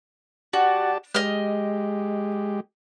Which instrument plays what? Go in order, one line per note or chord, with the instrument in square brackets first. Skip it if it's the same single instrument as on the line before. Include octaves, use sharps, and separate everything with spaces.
[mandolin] F#4 [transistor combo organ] G4 D5 A5
[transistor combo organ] G#3 G4 [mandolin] D#5 F6